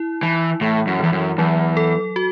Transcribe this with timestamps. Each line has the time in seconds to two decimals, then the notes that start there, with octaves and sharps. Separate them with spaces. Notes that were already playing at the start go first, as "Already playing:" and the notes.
Already playing: E4
0.23 E3 E4
0.61 A2 E3
0.87 F#2
1.00 E2 E3
1.13 F#2
1.38 E2 F#3
1.77 A4
2.16 F#4